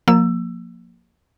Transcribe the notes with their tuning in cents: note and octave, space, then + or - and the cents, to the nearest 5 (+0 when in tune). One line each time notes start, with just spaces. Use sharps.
F3 +30 A#3 +0 E6 +20